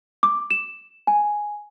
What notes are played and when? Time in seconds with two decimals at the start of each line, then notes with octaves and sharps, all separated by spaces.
0.23 D6
0.51 E7
1.07 G#5